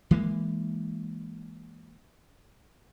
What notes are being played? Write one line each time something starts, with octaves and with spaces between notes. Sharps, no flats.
E3 G#3 A#3